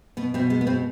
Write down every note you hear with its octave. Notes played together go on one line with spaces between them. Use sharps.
B2 B3
B2 C4
G#3 B3
B3
B2 C4